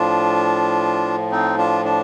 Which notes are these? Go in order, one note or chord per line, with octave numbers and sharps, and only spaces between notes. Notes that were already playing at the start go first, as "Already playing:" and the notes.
Already playing: A2 F3 D4 F4
C4 D#4
D4 F4
D4